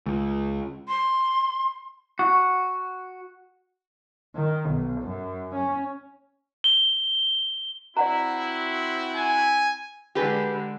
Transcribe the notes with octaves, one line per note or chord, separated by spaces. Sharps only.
C#2
C6
F#4
D#3
B1
F#2
C#4
G7
C4 E4 F#4 D5 F#5 A#5
G#5
D3 G#3 G4 G#4 B4